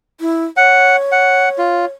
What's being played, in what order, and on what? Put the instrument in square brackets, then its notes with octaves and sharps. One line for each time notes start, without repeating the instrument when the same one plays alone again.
[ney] E4
[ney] C#5 [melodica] F#5
[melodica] F#5
F4